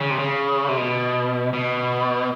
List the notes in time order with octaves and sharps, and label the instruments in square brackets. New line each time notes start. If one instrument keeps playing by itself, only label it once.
[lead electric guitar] C#3
C3
C#3
C3
B2
B2